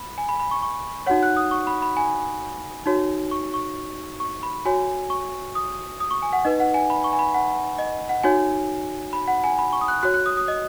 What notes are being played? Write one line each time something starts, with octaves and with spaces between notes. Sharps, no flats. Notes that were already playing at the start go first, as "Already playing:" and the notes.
Already playing: B5
G#5
B5
B5
C#6
C#6
D#4 F#4 C#5 F#5
F#6
D#6
C#6
B5
B5
G#5
D#4 F#4 C#5
C#6
C#6
C#6
B5
F#4 C#5 G#5
C#6
D#6
D#6
C#6
G#5
F#5
D#4 B4 D#5
F#5
G#5
B5
C#6
G#5
B5
F#5
D#5
F#5
D#4 F#4 C#5 G#5
B5
F#5
G#5
B5
C#6
D#6
F#6
F#4 C#5 F#6
F#6
D#6
D#6
D#5